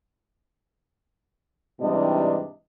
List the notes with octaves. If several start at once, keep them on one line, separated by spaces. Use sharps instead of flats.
G#2 C3 E3 G3 D4 D#5